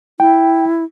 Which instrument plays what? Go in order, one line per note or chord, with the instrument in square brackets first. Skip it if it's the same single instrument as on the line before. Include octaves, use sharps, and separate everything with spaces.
[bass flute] E4 [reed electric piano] G5